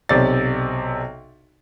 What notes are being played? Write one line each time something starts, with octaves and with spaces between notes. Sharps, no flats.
B1 C3 D5 A6